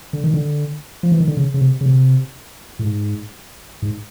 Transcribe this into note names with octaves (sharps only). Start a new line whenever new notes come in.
D3
D#3
D3
F3
E3
D#3
D3
C#3
C#3
C3
C#3
C3
A2
G#2
G#2